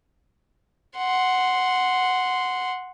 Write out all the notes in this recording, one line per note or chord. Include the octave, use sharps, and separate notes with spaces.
F#5 C6